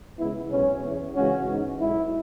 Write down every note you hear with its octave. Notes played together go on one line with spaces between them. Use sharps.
C#2 C#3 G#3 B3 E4
B1 B2 G#3 B3 C#4
E2 E3 B3
C#2 C#3 E3 G#3 C#4 F#4
G#2 E3 B3
B1 B2 G#3 E4